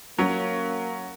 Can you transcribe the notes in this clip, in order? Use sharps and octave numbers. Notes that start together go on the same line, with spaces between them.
F#3 A#3 C#4